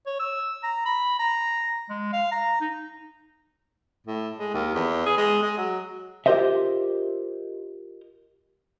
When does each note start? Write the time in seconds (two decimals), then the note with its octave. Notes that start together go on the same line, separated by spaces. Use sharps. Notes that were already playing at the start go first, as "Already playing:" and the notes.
0.06 C#5
0.20 E6
0.63 A#5
0.86 B5
1.19 A#5
1.90 G#3
2.13 F5
2.32 A#5
2.60 D#4
4.07 A2
4.39 G#3
4.54 D#2
4.75 E2
5.06 G#4
5.17 G#3
5.42 G#3
5.58 F#3
6.26 F4 G4 A#4 C5 D#5 E5